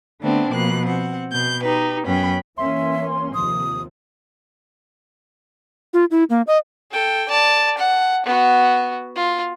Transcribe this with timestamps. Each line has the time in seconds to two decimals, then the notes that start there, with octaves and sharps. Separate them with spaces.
0.21 D3 A3 B3 C4 D4
0.52 B2 F3 A#3 F#6
0.85 C4 F#5
1.32 B2 G6
1.63 D#4 G4 B4
2.06 F#2 B3 C#4 G5 B5
2.58 E3 A#3 C#4 E5 C6
3.34 D#2 C3 F3 D#6
5.94 F4
6.11 E4
6.30 A#3
6.47 D#5
6.91 A4 G5
7.29 D5 A5
7.78 F#5
8.26 B3 F#4
9.15 F4